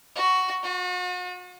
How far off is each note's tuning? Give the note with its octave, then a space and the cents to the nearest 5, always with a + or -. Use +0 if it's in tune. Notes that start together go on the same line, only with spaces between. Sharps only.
F#4 +10
F#4 -40